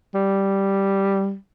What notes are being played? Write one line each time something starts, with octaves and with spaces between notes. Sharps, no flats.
G3